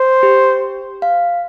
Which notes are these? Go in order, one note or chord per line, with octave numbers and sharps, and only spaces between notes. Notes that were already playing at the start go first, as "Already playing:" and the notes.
Already playing: C5
G4
F5